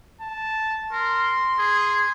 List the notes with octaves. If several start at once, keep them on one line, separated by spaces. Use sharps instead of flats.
A5
A#4 C6
G#4